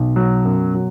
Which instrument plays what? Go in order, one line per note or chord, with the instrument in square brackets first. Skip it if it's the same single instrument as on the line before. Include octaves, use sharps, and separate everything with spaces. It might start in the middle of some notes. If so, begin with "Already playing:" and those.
Already playing: [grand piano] B1 [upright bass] B2
[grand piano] F#3
F#2
F#3